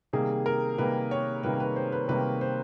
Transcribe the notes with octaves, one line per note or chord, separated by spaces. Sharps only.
C3 D#3 G3 A#3 G#4
A#4
C3 D#3 G3 A#3 B4
C#5
C3 D#3 G3 A#3 B4
B4
C5
B4
C3 D#3 G3 A#3 B4
C5